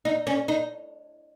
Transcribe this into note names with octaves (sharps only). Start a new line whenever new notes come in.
D#4
C#4
D#4